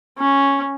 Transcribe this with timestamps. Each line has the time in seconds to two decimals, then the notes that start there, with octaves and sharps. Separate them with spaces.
0.18 C#4